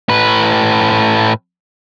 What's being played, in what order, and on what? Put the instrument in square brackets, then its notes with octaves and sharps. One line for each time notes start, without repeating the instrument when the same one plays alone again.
[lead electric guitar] A2 B4